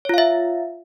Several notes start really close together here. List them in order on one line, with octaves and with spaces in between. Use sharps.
C#5 F4 F5 E5